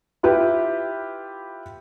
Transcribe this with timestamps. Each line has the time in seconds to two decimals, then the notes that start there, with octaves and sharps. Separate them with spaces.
0.23 E4 F4 G4 B4